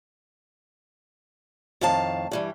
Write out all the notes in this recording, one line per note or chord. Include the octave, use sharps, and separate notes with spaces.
F2 A2 D#3 F5 A5
G2 E3 G3